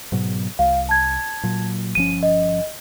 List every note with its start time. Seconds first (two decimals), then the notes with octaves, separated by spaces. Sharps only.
0.12 G#2 B2 F#3
0.59 C2 F5
0.89 A5 G#6
1.43 A#2 F#3
1.95 G1 F3 C#4 D#7
2.23 D#5